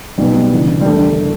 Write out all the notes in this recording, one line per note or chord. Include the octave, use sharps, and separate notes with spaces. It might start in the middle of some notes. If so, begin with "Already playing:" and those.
B1 B2 G3
D2 C#3 E3
G3
E1 D2 D3 A3